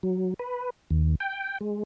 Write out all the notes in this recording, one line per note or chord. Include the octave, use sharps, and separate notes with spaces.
F#3
B4
D#2
G5
G#3